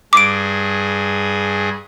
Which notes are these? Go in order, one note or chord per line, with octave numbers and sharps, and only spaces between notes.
G2 G#4 D6 D7